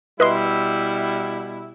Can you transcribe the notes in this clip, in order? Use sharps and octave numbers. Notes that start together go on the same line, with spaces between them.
B2 G3 E4 B4 D#5 C6